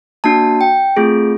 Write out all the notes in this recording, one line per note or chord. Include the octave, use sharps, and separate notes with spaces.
A#3 D4 F#4 A5
G5
A3 C4 F4 G#4